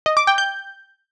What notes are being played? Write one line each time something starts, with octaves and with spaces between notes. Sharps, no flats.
D#5
D6
G5
G6